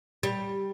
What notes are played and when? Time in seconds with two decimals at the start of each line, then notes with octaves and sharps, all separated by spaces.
0.23 G3